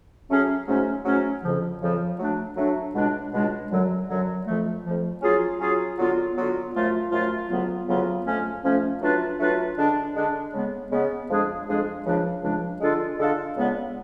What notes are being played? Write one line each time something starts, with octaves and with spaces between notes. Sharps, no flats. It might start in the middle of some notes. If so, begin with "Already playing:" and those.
F#3 A3 C#4 G#4
G#2 F#3 A3 C#4
G#2 F#3 A3 C#4
F2 C#3 F3
F2 C#3 F3
F#3 A3 D4
F#3 A3 D4
C#2 B2 G#3 D4
C#2 B2 G#3 D4
F#2 D3 F#3
F#2 D3 F#3
F2 F3 A3
F2 F3 A3
F#3 C#4 F4 G#4
F#3 C#4 F4 G#4
D3 F#3 B3 F4
D3 F#3 B3 F4
F#2 F3 A3 F4
F#2 F3 A3 F4
D2 C#3 F#3 B3 F4
D2 C#3 F#3 B3 F4
F2 F3 A3 C#4
F2 F3 A3 C#4
F#3 A3 D4 F4 B4
F#3 A3 D4 F4 B4
D3 G#3 D4
D3 G#3 D4
C#3 G#3 B3
C#3 G#3 B3
F2 F3 G#3 D4 G#4
F2 F3 G#3 D4 G#4
C#2 C#3 F3 G#3 D4
C#2 C#3 F3 G#3 D4
D3 G#3 D4 F4 A4
D3 G#3 D4 F4 A4
C#2 C#3 G#3 B3 D4